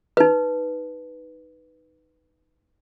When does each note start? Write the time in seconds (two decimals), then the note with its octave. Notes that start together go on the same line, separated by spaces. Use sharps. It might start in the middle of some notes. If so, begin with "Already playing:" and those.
0.17 D#4 B4